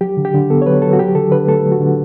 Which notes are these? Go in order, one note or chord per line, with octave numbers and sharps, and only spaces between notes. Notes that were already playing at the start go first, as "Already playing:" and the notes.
F#3 G4
D3
G4
D3
B3 A4
C#5
F#3 B4
F#3 A4
F#4
F#3 G4
D3 A4
D3 B4
A3 A4
F#3
F#4
D3